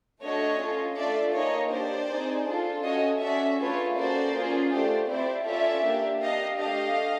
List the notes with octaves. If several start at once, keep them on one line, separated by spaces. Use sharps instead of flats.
A3 D4 F#4 A4 C#5 D#5
C#4 F4 A4
A3 D4 F4 A4 D5 E5
A#3 D#4 G#4 C#5 D#5
D4 G4 C5 D5
C4 D#4 G#4
D4 F4 A4
C#4 F#4 A4 C#5 D#5
C#4 F#4 A4 D5 E5
A3 D4 F4 G#4 B4 C#5
A#3 C#4 F#4 A4 C5 D5
A#3 C#4 F4 G#4
A3 D4 G4 C5 D5
C4 E4 G4 C5 D5
C#4 F4 A4 D5 E5
A#3 D4 G4
D4 G4 D#5 F5
A3 D4 G4 D#5 F5